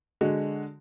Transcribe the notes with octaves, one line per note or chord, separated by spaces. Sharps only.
D3 G#3 F#4